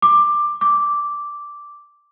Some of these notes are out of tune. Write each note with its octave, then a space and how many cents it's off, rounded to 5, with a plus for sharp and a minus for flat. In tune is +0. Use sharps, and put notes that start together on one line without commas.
D6 +15
D6 -5